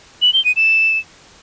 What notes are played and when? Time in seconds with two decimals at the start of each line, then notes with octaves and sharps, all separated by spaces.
0.22 F#7
0.33 G7
0.45 D#7
0.56 E7